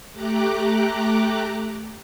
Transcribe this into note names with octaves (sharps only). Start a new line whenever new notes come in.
A3 G4 A#5 D6 F#6